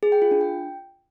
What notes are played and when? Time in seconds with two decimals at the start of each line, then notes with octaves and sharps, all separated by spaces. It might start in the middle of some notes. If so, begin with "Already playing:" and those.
0.03 G#4
0.12 G5
0.22 F4
0.31 D4
0.41 G5